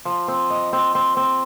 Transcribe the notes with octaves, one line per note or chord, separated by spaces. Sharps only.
F3
C4
D#5
C4
C4
C4